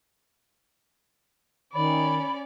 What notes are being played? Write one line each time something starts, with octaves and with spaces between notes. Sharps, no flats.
D#3 C#4 D5 B5